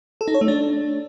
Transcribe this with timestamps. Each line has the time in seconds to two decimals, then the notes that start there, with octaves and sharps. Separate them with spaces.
0.21 A4
0.28 D#4
0.34 C#5
0.41 A3
0.48 D4